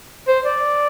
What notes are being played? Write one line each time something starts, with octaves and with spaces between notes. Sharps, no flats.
C5
D5